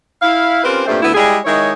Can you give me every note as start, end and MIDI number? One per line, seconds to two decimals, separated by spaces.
0.21 0.60 64
0.21 0.60 77
0.64 0.84 60
0.64 0.84 61
0.64 0.84 65
0.64 0.84 67
0.64 0.84 70
0.64 0.84 71
0.87 1.00 43
0.87 1.00 46
0.87 1.00 55
0.87 1.00 57
0.87 1.00 60
1.01 1.14 38
1.01 1.14 59
1.01 1.14 64
1.14 1.37 55
1.14 1.37 56
1.14 1.37 64
1.14 1.37 67
1.14 1.37 68
1.45 1.72 51
1.45 1.72 56
1.45 1.72 63
1.45 1.72 64
1.45 1.72 73